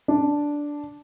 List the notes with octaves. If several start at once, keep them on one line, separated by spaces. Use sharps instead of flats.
D4